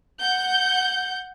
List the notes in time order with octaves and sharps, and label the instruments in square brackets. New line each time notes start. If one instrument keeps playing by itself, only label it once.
[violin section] F#5 G6